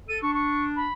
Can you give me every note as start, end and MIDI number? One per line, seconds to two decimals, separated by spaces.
0.08 0.21 69
0.08 0.21 99
0.22 0.86 62
0.22 0.33 85
0.34 0.65 85
0.76 0.93 83